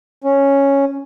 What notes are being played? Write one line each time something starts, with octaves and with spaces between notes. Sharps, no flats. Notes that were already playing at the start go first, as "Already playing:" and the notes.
C#4